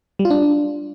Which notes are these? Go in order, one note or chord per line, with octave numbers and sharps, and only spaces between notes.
G3
F4
D4